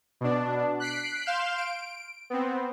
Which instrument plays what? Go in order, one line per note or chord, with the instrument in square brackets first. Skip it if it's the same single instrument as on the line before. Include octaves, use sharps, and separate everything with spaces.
[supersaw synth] B2 D4
F#6 B6 C7 D7
F5 C6 F6 G6 E7
D7
B3 C4